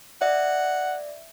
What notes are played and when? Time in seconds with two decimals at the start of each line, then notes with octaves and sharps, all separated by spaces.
0.21 D5 E5 F#5